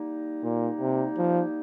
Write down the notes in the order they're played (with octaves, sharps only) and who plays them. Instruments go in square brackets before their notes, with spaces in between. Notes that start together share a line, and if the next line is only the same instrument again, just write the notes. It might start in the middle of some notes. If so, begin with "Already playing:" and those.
Already playing: [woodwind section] G3 A#3 D#4
[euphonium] A#2
C3
F3